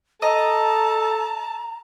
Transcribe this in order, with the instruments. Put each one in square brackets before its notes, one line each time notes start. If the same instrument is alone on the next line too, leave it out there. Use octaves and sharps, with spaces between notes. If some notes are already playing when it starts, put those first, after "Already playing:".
[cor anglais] A4 [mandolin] D#5 [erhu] A5 [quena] A#5